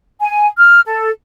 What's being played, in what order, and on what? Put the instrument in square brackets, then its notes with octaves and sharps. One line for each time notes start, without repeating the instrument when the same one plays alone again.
[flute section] G#5
F6
A4